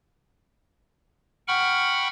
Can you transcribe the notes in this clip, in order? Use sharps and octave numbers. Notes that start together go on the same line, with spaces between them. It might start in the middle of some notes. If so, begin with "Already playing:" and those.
F#5 G5 B5 C#6 F6